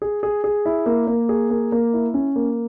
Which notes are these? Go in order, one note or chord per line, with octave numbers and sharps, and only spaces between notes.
G#4
G#4
G#4
E4
A#3
A#3
G#4
A#3
A#3
E4
C#4
A#3